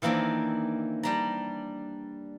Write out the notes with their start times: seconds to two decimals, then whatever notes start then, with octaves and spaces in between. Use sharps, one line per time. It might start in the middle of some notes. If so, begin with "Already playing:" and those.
0.02 D#3 E3 A#3 C4 D4
1.03 G3 D4 A#5